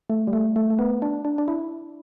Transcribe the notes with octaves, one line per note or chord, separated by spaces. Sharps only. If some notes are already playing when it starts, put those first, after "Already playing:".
A3
G3
A3
A3
A3
B3
D4
D4
D4
E4